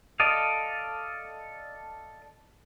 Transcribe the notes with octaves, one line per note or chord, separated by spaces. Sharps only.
A4 D5 D#5 F5